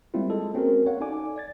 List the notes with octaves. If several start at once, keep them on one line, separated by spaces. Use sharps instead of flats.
G3 G#3 A#3 C4 E4 F4
G#3 A4
A#3 C4 C#4 F#4 G#4 A#4
C#5 F5 F#5
D#4 A4 D5 G#5 D6
D5 G#6 A6